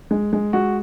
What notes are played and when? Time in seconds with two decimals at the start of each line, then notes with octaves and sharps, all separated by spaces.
0.11 G#3
0.33 G#3
0.53 G#3 F#4